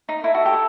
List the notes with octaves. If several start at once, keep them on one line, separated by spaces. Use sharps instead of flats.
D#4
E4 A4
F#4
G4